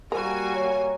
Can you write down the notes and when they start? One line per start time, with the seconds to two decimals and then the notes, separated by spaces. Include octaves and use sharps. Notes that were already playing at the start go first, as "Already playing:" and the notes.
0.12 G3 A#3 F#4 A#4 C5 G#5
0.55 C#5